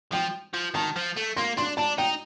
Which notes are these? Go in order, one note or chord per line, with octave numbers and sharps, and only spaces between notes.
F3 G5
F3
D#3 A5
F3
A3
A#3 C6
D4 C6
D4 A5
D#4 G5